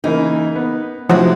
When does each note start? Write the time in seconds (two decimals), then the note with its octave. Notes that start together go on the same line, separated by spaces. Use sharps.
0.04 C#3 E3 A#3 D#4
0.56 B3
1.09 D2 C3 F3 F#3 G#3 E4 F#4 G4